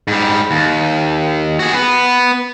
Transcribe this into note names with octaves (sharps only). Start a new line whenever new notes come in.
G#2 G3
D#2
F#4 G#4
B3